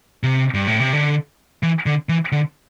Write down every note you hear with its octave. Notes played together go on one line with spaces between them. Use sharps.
C3
G2
A2
C3
D3
E3
D3
E3
D3